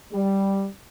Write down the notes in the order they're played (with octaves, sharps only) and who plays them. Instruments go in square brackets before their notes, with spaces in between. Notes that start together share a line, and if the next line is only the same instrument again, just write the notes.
[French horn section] G3